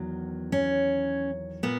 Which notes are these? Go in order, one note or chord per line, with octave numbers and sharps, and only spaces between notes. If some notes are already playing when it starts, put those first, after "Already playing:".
Already playing: E2 D#3 F#3
C#4
A#2 B3